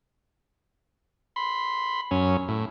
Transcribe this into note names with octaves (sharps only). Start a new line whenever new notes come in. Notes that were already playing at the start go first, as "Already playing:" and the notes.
B5 C6
F#2 C#4
A2